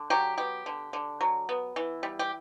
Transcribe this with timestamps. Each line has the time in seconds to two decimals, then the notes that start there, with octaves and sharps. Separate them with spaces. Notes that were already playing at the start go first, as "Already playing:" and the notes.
Already playing: D3
0.10 F#3 G4
0.37 B3 G4
0.66 D3
0.93 D3
1.21 F#3
1.49 B3
1.76 E3
2.03 G3
2.19 G4